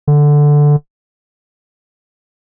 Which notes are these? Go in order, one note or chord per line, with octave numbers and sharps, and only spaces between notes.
D3